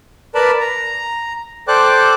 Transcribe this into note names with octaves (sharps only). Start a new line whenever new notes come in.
A#4 B4 D5 A5 B5
A#5
A4 C5 D5 G5 D6 F#6